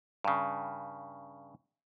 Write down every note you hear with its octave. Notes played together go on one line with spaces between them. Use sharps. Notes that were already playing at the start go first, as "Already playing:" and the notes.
G2 C#3